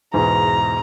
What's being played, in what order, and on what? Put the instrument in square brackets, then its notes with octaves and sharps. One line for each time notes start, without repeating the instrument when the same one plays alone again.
[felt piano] E2 G#2 B2 [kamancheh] A#5